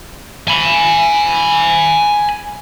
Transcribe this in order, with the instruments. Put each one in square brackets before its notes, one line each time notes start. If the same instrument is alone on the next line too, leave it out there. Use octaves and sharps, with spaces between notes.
[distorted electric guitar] G#5 B5